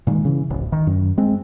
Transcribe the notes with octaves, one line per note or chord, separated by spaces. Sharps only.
A#2 D#3 E3 G#3
C#3 E3
D1 A1
D#3
F#2
G#3 C4